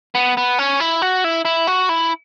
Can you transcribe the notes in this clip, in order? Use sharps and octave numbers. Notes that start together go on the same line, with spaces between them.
B3
B3
C#4
E4
F#4
E4
E4
F#4
E4